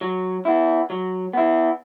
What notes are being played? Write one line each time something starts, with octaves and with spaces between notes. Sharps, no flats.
F#3
B3 E4
F#3
B3 E4